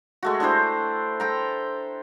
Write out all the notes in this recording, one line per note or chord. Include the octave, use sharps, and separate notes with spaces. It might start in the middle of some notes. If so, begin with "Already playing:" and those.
G#3 A3 F#4
D4 E4 G4 C5
A4 G5 A#5